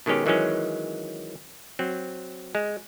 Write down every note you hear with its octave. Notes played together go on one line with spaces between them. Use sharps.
B2 D#3 G#3 C#4 G4
D#3 E3 F#3 G#3 C#4
F#3 C4
G#3